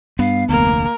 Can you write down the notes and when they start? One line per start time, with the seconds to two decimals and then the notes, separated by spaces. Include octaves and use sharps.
0.19 G2 B3 F5
0.49 F1 D2 A#3 A#4